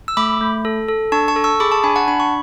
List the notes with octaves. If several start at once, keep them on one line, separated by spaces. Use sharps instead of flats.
E6
A3 B5 D6
A3
A4
A4
D4 A5 C#6
A5 C#6
A4
C#6 E6
G#4 B5 D6
A5 C#6
D4 G#5 B5
F#5 A5
D4 B5
C#6